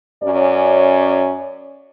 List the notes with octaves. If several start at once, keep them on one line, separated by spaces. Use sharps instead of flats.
F#2 C#4 C#5 D5